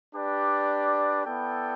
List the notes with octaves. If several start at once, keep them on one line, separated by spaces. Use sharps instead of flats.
D4 G4 B4 D5
B3 E4 A4 D5 G5